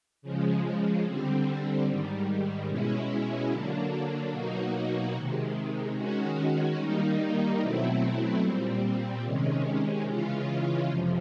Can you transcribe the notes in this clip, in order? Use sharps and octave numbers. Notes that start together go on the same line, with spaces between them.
C#3 F3 G#3
D3 G3 C4
G#2 D#3 G3
B2 G#3 C#4 E4
D3 F#3 A#3 D4
B2 F#3 A#3 D#4 F#4
C3 D#3 G#3
D#3 G#3 C#4 F#4
D#3 G3 A#3 D#4
B2 F#3 A3 C4 E4
A#2 G3 C4
C3 D#3 G#3 C#4
C#3 E3 G#3 C#4 F4
F2 C3 F3